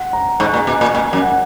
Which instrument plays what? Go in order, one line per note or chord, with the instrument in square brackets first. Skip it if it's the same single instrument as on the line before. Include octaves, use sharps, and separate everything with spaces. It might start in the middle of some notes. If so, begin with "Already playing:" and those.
Already playing: [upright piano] F#5
A#5
[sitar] G#2 [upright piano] C#6
[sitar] A#2 [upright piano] A#5
[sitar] B2 [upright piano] G#5
[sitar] A#2
[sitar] A#2 [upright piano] G#5
[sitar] F#2
[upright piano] F#5